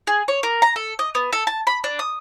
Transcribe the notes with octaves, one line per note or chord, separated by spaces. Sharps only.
G#4
C#5
A#4
A#5
A4
D#5
B3
A4
A5
B5
D4
D#6